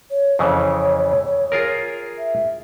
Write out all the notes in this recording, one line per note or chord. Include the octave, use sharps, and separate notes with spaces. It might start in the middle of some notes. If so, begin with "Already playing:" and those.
C#5
F2 C#3 E3 C#5
F4 G#4 A#4
E5